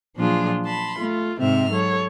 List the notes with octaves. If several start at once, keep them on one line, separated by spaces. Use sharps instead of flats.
A#2 F3 F#3 D4 F4 G#4
A5 B5 C6
A3 F4
G#2 C3 C4 E5 F6
F#3 A4 C#5